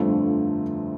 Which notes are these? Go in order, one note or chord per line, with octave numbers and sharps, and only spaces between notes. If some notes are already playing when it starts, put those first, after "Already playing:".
Already playing: G1 F2 D3 F3 A3